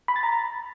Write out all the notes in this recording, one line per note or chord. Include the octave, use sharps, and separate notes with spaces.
B5
A6
A#5